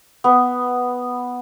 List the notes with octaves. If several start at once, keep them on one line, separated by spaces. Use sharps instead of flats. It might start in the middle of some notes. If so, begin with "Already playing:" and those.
B3